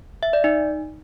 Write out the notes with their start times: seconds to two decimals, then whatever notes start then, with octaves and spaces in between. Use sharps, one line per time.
0.23 E5
0.33 D5
0.44 D#4